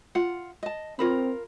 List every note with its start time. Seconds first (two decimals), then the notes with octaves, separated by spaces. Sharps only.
0.15 F4 F#5
0.63 D#5 A5
0.99 C4 F4 A#4 B5